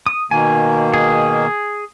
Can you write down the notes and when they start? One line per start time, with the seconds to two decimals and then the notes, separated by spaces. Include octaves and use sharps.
0.06 D#6
0.31 B2 D#3 A#3 G#5
0.94 G#4